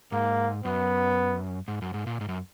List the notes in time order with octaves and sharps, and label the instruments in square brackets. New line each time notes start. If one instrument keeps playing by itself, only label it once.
[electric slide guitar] G#2 [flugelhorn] A#3
[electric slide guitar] F#2 [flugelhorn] B3
[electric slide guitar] G#2
F#2
G#2
A#2
G#2
F#2